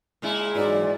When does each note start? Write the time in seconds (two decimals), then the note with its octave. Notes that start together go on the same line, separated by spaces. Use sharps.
0.22 A#2 G#3 E4
0.56 G#2 E3 F#3 D#4 D5